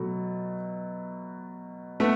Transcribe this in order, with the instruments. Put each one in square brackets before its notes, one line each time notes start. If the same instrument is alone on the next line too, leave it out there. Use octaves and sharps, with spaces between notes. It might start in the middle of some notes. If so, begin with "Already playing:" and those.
Already playing: [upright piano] B2 F#3 A3
[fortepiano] A3 B3